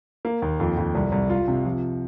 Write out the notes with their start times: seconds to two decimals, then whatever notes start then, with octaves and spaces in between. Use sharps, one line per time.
0.25 A#3
0.42 D#2
0.60 F2
0.77 F2
0.95 C2
1.12 C2
1.30 F4
1.48 C3
1.65 F3